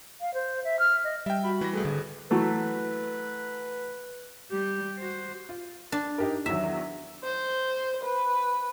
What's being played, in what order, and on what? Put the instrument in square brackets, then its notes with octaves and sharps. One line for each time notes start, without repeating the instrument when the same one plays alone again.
[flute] F5
C5
E5
F6
D#5
[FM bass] G3 [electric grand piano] E5 G5
[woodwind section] F#4 B5
[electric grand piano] E3 A#6 [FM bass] G3
[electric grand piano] C2 A3 [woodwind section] G#4 A4 B4
[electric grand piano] G#1 [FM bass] D3
[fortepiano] E3 F#3 A3 [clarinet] B4
[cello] G3 G4
F#4 C5
[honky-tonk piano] F4
[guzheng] D4
[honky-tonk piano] D#4 G4 A#4
[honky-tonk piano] E2 D#3 F#3 [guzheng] E5
[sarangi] C5
B4